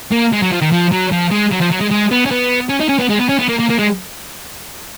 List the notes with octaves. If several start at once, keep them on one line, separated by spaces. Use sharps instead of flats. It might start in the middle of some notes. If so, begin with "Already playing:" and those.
A#3
G#3
F#3
F3
D#3
F3
F#3
F3
G#3
F#3
F3
F#3
G#3
G#3
B3
C#4
B3
C#4
D#4
C#4
B3
G#3
B3
C#4
B3
A#3
A#3
A#3
G#3